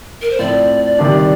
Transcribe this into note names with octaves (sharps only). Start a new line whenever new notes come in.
A#4
C5
A2 F3 C4 D5
C3 D#3 G3 D4